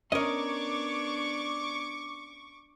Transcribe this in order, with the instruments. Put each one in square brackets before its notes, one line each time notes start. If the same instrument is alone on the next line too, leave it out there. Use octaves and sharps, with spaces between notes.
[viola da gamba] B3 D4 C#5 [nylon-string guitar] C#4 [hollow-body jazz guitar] A#4 D#5 [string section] C#6 D6